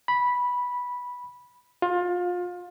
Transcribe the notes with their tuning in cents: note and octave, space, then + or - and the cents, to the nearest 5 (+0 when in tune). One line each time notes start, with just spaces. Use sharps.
B5 -10
F4 +25